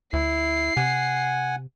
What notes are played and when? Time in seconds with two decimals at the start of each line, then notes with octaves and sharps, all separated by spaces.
0.13 D2 E4 C7
0.77 C3 F#5 G#5